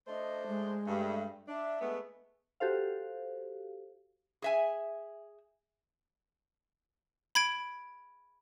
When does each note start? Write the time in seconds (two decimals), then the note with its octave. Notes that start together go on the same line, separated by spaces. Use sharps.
0.07 A3 D4 C5 D#5
0.47 G#3
0.87 G2 A3
1.48 D4 E5
1.81 G#3 A3 B3
2.60 F#4 G4 A4 C5 F5
4.42 G#4 E5 G#5
7.35 B5 G#6 D7